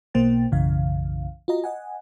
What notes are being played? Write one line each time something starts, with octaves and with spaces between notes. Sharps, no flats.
B1 B2 A#3 C5 G5 A6
B1 F#2 C#3 E3 F5
F4 F#4 D#5 A#5
D#5 F#5 G#5